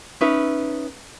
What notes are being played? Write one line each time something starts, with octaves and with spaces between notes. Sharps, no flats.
C#4 D#4 B4 E5